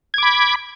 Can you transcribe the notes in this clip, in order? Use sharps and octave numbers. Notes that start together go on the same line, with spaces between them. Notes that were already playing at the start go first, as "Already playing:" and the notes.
B5 D6 G#6